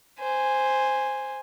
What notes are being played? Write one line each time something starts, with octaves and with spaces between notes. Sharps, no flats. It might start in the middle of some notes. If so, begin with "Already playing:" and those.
C5 G#5